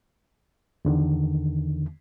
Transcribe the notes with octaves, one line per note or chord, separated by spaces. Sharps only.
E2 D3 D#3